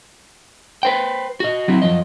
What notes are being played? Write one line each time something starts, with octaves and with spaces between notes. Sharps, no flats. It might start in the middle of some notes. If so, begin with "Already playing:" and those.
B4 C5 G5
F#4 D#5
F#3 C4 E4
F#2 F3 D#5